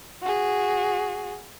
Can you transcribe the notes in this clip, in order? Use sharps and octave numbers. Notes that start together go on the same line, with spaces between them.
F#4 G#4